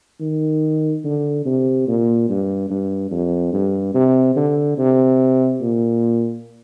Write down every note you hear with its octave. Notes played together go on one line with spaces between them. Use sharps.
D#3
D3
C3
A#2
G2
G2
F2
G2
C3
D3
C3
A#2